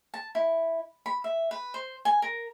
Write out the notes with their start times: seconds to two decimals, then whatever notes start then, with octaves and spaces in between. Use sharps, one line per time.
0.14 A5
0.35 E4
1.06 B5
1.24 E5
1.51 B4
1.74 C5
2.05 G#5
2.22 A#4